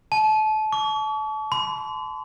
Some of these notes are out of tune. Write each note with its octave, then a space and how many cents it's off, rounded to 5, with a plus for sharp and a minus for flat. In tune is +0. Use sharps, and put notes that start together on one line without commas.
A5 -30
C#6 +45
C6 -40